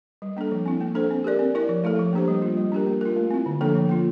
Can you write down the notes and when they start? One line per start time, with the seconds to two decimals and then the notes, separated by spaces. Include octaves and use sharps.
0.22 G3
0.37 A#3 D4 A4
0.52 F3
0.66 C4 E4
0.80 A#3
0.95 D4 A4 C5
1.11 C4
1.24 G4 A#4 D5
1.39 C4
1.55 E4 A#4 D5
1.69 F3
1.84 A3 E4 A4
1.99 F3
2.13 A#3 D4 G4 C5
2.28 G3
2.42 A#3 F4
2.57 G3
2.72 D4 G4 A#4
2.87 A#3
3.01 F4 A#4
3.16 A3
3.31 C4 E4
3.46 D3
3.61 F3 A#3 D4 A4
3.75 F3
3.89 A#3 F4